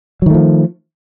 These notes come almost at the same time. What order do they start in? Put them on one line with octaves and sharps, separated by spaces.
F#3 D#3 A3 F3